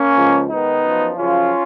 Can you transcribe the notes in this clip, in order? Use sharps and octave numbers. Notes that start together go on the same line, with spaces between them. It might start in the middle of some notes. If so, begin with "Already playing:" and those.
Already playing: A#3 C#4
C#2 C#3 F3
G#2 D#3 B3 D#4
F#2 F3
F#2 C#3 F3 C#4 F4